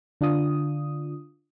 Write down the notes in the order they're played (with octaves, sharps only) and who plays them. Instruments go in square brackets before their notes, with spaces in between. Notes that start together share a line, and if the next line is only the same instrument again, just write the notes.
[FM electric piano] D3 D4 F4 D#6